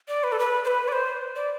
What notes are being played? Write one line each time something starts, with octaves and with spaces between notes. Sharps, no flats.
D5
B4
A4
B4
C5
B4
D5
C5
D5